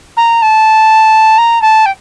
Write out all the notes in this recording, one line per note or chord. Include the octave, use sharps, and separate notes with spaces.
A#5
A5
A#5
A5
G5